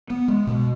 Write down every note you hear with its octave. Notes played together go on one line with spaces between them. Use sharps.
B3
G#3
B2